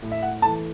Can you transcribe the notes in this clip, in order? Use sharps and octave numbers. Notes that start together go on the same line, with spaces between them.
A2
E5
F#5
E3 A3 A5